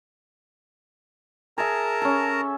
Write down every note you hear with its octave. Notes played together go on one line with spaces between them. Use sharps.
G#4 A#4 E5 A5 A#5
C#4 A4